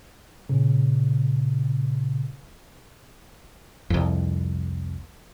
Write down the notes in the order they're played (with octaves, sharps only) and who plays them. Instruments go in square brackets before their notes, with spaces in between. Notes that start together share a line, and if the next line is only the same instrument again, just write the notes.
[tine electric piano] A#2 C#3
[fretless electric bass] C2 F2